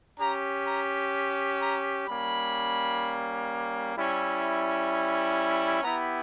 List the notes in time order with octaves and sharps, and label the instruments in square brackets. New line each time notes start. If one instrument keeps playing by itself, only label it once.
[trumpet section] C#4 G4 A#5
A#5
A#5
G3 A#3 C#4 B5
G3 C#4 E4
B3 E4 G4 A#5